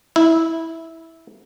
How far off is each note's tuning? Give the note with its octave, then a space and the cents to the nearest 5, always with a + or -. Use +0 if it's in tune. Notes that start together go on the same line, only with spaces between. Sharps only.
E4 -10